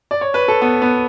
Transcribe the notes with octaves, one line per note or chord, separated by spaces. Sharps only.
D5
C#5
B4
A4
B3
B3